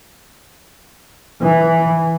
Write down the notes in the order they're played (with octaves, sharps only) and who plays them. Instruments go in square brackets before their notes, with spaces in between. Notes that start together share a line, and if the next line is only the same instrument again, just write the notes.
[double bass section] E3